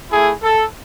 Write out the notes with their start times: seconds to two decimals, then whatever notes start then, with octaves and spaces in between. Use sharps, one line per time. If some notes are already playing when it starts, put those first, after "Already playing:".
0.10 A3 E4 G#4
0.42 A4